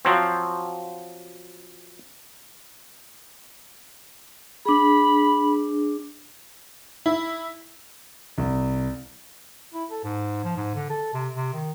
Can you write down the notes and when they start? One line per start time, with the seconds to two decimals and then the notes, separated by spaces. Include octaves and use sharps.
0.05 F3 F#3 C4
4.66 D4 G#4 B5
7.06 E4
8.38 C2
9.74 E4
9.91 A4
10.04 G#2
10.44 F3
10.57 G#2
10.75 D3
10.90 A4
11.14 C3
11.34 C3
11.53 D#3